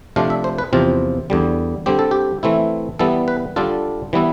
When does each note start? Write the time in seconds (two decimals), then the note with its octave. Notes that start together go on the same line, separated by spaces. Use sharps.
0.16 C3 F3 A3 D4 F4 F5
0.30 E5
0.44 C5
0.58 B4
0.73 E2 C3 F3 C4 F4
1.30 E2 D3 G3
1.86 D3 G3 C4 G4
1.99 A4
2.11 G4
2.43 E3 A3 C4 E4
2.99 E3 G3 B3 A4
3.28 B4
3.56 D3 G3 D4 F4 A4
4.13 E3 G3 B3 E4